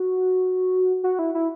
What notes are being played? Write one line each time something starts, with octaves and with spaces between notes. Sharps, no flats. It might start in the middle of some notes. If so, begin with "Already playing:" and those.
Already playing: F#4
F#4
E4
E4